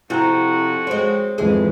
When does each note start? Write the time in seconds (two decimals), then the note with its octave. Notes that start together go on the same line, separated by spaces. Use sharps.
0.10 F2 C3 E4 F#4 G5 A#5
0.87 G#3 C4 C#5
1.38 F2 G#2 E3 G#3 E4 G#4